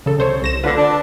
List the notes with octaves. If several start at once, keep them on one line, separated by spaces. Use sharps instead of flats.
C#3 A4
C2 C5 C#5
C2 A#6 E7
D2 D3 F4 B4
D4